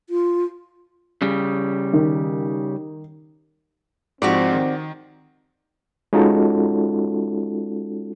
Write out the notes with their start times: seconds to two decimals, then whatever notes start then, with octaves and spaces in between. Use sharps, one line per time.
0.10 F4
1.22 C#3 G3
1.93 D#3
4.22 G#2 F3 C4 F#4 G4 D5
4.54 D#3
6.13 G#3 C#4 D#4 F4 F#4 A4